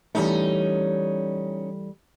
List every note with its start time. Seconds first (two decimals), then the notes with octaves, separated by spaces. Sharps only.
0.15 E3 G3 A3 C#4 D#4